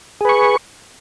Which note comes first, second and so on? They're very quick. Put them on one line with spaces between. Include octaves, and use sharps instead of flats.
G#4 B4 C#6